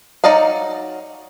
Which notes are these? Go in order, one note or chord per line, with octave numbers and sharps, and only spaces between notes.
F#3 D#4 D5 D#5 F5